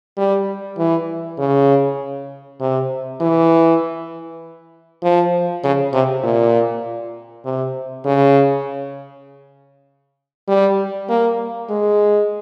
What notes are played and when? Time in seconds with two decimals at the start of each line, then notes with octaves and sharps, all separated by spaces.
0.17 G3
0.78 E3
1.38 C#3
2.60 C3
3.21 E3
5.03 F3
5.64 C#3
5.93 C3
6.24 A#2
7.45 C3
8.05 C#3
10.48 G3
11.09 A#3
11.70 G#3